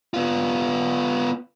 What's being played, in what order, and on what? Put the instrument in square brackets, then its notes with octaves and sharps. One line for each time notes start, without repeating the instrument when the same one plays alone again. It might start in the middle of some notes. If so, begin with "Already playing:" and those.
[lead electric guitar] B3 F4